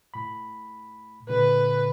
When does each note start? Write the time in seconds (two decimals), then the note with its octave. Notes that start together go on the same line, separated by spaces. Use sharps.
0.14 A2 B5
1.29 A#2 D3 B4